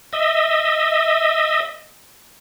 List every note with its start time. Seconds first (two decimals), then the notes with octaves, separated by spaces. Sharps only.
0.13 D#5 E5